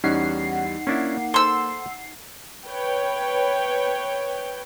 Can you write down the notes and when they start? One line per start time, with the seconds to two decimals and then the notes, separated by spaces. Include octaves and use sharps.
0.04 E2 G3 C#4 D#4 F#5 C7
0.87 A#3 C#4 D4 E4
1.34 A4 C5 A5 C6 E6
2.65 B4 C#5 G5